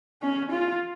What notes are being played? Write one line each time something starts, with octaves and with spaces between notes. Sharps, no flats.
C#4
F4